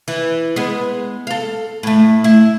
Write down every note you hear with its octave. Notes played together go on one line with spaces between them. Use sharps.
E3
G#3 B3
A4 F5
A2 A3
E4